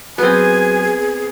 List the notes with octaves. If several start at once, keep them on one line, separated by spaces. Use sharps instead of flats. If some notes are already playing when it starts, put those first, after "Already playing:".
F#3 B3 C4 F#4 G#4 G#5